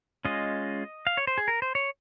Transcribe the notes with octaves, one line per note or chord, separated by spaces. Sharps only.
G#3 C#4 F4 D#5
F5
C#5
C5
G#4
A#4
C5
C#5